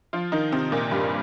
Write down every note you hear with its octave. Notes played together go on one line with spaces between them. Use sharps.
F3 F4
D#3 D#4
C3 C4
A#2 A#3
G2 G3